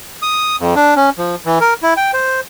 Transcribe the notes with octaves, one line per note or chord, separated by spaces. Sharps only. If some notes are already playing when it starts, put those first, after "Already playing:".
D#6
F2
D4
C#4
F3
E3
A#4
E4
G5
C5